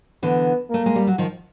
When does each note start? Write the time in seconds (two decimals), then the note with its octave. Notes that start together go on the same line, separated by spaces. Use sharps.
0.23 D3 E3 B3
0.70 A3 A#3
0.86 G#3
0.96 G3
1.07 F#3
1.18 D#3 F3